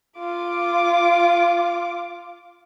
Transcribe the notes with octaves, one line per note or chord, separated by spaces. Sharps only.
F4 D6